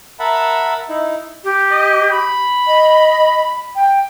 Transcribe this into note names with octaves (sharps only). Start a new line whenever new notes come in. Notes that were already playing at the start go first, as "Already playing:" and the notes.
A#4 E5 F#5 A5 B5
D#4 E4
G4
D#5
B5
D#5
G5